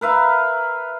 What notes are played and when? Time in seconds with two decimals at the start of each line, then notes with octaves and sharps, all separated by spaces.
0.01 A#4 B4 E5 F5